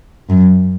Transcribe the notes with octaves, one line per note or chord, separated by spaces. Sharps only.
F#2